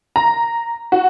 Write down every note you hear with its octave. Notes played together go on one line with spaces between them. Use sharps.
A#5
F#4